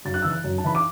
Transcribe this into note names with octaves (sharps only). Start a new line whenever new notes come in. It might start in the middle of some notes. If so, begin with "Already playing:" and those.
F#2 A6
F#6
E3 E6
F#6
F#2
A5
E3 B5
D6